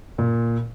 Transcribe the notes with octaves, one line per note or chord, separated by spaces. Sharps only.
A#2